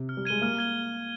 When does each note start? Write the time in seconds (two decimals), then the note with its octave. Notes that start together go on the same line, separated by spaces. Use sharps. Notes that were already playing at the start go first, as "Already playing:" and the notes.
Already playing: C3
0.09 F6
0.17 G3
0.25 G#3 G#6 D#7 G7
0.42 A#3 F6
0.58 G#6 D#7 G7